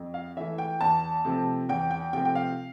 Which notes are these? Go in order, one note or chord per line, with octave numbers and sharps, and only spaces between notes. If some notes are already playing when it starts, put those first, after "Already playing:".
Already playing: F2
F5
E3 A3 E5
G5
E2 A5
C3 F3 A3 C4
E2 G5
G5
C3 F3 A3 C4 G5
G5
F5